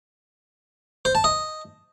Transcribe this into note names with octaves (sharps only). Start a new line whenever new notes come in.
C5
A5
D#5